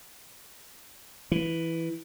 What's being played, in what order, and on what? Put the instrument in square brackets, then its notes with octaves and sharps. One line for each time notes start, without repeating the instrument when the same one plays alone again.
[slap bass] E3